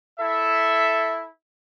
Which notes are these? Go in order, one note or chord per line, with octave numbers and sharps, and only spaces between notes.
E4 A4 E5